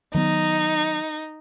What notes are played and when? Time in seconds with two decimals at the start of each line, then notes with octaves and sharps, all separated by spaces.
0.14 D#3 F#3 B3 D#4